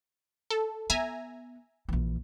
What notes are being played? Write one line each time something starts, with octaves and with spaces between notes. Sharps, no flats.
A4
B3 E5 G#5 A#5
A#1 E3